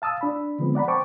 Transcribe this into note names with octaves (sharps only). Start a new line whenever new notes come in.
F5 A5 D#6 E6
D4 B5
D3 F3 G#3 B3 C4
D5 F#5 A#5 B5
C5 G5 A5 C#6 D6